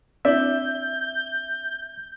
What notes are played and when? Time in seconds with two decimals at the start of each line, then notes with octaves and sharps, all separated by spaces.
0.25 C4 D4 E4 D5 E5 G6